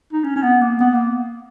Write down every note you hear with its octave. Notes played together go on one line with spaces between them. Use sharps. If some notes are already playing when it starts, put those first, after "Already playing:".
D#4
C#4
C#4
B3
A#3
B3
A#3